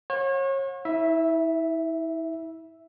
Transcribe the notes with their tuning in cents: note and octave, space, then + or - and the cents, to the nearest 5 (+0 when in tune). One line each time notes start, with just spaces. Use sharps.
C#5 -35 F#5 -45
E4 -35 E5 +0